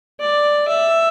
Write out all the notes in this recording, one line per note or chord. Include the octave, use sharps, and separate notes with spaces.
D5
E5